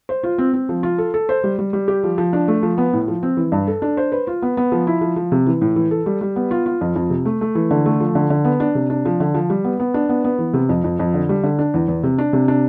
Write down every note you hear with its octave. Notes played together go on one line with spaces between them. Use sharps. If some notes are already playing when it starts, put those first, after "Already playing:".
C5
F4
C4
C4
F3
F4
A4
A4
C5
G3
G3
G3
G4
F3
F3
D4
A3
F3
B3
A2
F3
C4
E3
G2
A4
D4
C5
B4
F4
B3
B3
F3
E4
F3
F3
C3
E3
A2
E3
A4
G3
G3
B3
F4
F4
F2
F2
C3
A3
A3
E3
D3
A3
F3
D3
D3
B3
D4
C3
D4
F3
D3
F3
G3
B3
B3
D4
B3
B3
E3
C3
F2
F2
F2
D3
G3
D3
D4
E2
E2
C3
D4
C3
D4